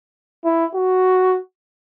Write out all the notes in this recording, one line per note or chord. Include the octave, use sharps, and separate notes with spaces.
E4
F#4